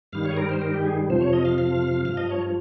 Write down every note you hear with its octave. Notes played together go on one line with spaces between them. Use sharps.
G2 D#3 G3 F5
C#5
G#4
A#4
C5
A#4
G4
G#4
F2 C3 F3 C5
C#5
D#5
F5
F5
G2 F3 F5
D#5
C#5